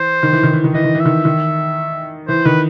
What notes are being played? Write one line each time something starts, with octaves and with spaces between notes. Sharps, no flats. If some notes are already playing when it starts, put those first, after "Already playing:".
Already playing: E3 C5
D#3
E3
D#3
E3
D#3
E3 D#5
D#3
E3
E5
D#3
D#3
E3 C5
D#3 B4